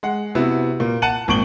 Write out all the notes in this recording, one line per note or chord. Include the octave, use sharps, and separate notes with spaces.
G#3 F#5
C3 B3 E4 F#4
A#2 A#3
F#5 A5 F#6 C#7 D#7 F#7
G#1 A#2 C#6 D7 F#7 G7